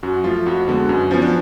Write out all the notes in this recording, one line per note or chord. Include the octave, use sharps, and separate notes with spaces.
F#2 F#4
F3 A3 F4
F2 F#4
D3 G#3 B3
F#2
F3 B3 C#4
D4